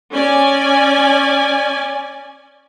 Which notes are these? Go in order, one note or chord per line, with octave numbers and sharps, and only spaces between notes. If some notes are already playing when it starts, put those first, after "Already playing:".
C#4 D5 G#5